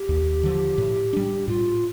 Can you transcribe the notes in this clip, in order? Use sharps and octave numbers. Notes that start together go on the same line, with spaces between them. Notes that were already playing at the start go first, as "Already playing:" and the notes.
Already playing: G4
D#2
D3 F3
A2
G3 D4
A2 F4